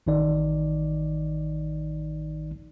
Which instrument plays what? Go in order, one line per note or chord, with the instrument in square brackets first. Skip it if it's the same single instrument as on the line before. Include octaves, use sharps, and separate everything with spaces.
[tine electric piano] A1 D#3 D#4 D5